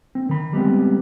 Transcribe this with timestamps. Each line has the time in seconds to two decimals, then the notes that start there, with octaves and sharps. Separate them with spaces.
0.15 C4
0.29 D#3 B5
0.53 G3 G#3 B3 C4